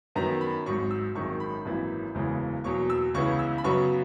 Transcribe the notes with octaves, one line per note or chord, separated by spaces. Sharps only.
F#2 D#3 F#3 B3 A#5
B5
G#1 G#2 F#3 C#6
E6
G#1 F#2 D#3 G#3 C#6
B5
G#1 F#2 E3 A#3
F#1 E2 C#3 E3 G#3
E2 B2 F#3 A#3 C#6
E6
C#2 C#3 E3 G#3 B3 C#6
E6
B5
F#2 C#3 F#3 B3 C#6